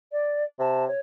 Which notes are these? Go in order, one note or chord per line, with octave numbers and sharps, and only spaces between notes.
D5
C3 A5
C#5